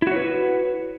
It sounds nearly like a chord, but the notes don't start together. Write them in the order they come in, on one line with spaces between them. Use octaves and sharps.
E4 F#4 C#5 B4